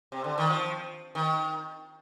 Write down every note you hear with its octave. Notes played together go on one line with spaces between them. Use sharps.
C3
D3
D#3
F3
D#3